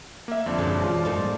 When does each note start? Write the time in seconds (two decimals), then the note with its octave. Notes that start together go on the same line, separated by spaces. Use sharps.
0.28 A#3 E5
0.46 F2 D3 C5 D5 A5
0.59 F#2 B2 F#3 G#3
0.83 E3 F4
1.05 F#2 A2 D#3 D#4 A4
1.18 G#2 G3 A#3